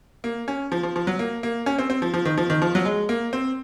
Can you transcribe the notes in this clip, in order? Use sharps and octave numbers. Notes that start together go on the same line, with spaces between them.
A#3
C#4
F3
F3
F3
F#3
A#3
A#3
C#4
C4
C4
F3
F3
D#3
F3
D#3
F3
F#3
G#3
A#3
C4